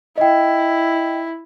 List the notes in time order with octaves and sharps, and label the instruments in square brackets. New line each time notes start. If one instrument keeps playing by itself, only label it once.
[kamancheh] E4 [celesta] D#5 G5